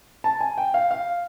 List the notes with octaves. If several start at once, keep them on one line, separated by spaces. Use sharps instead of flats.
A5
G#5
G5
F5
F5